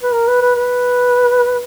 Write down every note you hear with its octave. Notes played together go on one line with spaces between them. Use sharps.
B4
A#4
B4
B4
B4